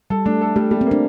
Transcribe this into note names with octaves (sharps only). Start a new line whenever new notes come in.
G3 A4
A3 D4
A4
G3 A3
G3 A#3
C4
A#3
D4